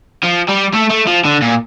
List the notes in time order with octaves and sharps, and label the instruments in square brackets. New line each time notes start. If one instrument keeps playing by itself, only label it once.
[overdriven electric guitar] F3
G3
A3
A3
F3
D3
A#2